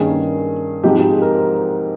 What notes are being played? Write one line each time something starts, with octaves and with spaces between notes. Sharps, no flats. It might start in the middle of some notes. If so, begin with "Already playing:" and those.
Already playing: G2 D#3 A#3 C#4 G#4
G#2 F3 C4 D#4 G4
G4
G#4
A#4
C5